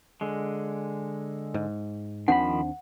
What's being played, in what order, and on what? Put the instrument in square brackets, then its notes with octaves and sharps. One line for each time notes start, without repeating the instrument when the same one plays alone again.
[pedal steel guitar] D3 G#3
[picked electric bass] G#2
[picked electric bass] D#2 C4 D4 [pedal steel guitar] D#3 F3 B5 [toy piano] F#5